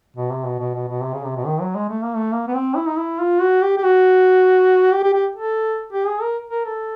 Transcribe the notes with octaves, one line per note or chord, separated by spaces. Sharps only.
B2
C3
B2
B2
B2
B2
C3
C#3
C3
B2
D#3
F#3
G#3
A3
A#3
A3
A#3
B3
C4
E4
D#4
E4
F4
F#4
G4
G4
F#4
G4
G4
G4
A4
G4
G#4
A#4
A#4
A4